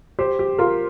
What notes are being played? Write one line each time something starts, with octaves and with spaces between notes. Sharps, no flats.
G4 C5
G4
F4 A#4